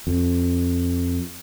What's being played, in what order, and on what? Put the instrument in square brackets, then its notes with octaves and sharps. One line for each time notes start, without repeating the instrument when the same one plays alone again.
[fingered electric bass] F2